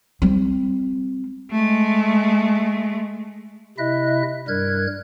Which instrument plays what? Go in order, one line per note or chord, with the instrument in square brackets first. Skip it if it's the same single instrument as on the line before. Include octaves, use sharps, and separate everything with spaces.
[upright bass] G3 C4
[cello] G#3 A3
[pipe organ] C3 E4 D#5 E5 F#6
G2 G3 A#4 F#6 G#6